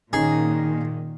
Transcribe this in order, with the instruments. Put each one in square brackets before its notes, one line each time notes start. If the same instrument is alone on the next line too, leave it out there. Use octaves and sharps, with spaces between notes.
[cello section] A#2 [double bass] D#3 [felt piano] C#4 D#4 [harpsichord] G#4